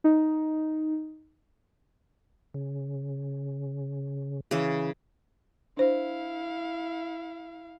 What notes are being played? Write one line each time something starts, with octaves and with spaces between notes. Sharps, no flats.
D#4
C#3
C#3 E3
D4 E4 C5 F5